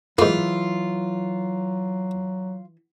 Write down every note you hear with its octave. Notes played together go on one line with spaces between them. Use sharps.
G#2 E3 F#3 A#3 F4